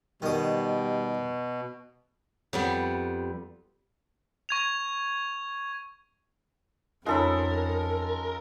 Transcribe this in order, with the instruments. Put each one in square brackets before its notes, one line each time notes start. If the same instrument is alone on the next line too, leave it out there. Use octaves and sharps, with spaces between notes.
[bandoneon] B2 [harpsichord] D#3 D#6 [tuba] G3
[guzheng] F2 G3 B3
[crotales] C#6 G#6 F7
[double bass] F2 [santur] G#3 A4 B5 [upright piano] C#4 D#4 F4 [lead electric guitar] A#4